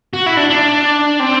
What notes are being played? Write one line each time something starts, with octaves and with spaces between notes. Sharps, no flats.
F#4
E4
D4
D4
C4